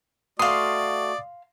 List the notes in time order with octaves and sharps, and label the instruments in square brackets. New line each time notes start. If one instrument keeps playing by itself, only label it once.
[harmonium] A3 F#4 [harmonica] D5 [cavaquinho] F5 C6 [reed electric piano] D#6